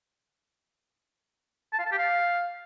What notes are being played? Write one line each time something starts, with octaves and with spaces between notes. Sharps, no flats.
A5
F5
A5
G4
F5